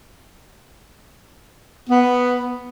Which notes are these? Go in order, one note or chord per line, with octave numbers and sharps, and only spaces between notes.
B3